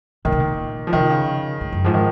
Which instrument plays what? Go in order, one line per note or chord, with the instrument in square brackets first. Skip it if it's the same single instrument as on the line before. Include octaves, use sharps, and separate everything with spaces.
[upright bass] A#2 [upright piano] D#3
[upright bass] C3
A#2
[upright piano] F3
[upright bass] C3 [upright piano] D#3
[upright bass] C#3
G#2
F#2
[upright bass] G#2 [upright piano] F3
[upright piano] D#3